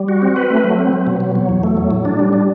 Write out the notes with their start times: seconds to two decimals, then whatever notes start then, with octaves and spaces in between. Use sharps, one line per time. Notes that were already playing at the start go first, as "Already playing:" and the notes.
Already playing: G3
0.08 F#4
0.22 C4
0.36 B4
0.50 A3
0.64 F#3
0.79 C4
0.93 F#3
1.07 B2
1.20 F#3
1.35 F#3
1.49 E2
1.63 A3
1.77 F#3
1.91 A2
2.05 D4
2.19 G3
2.33 D4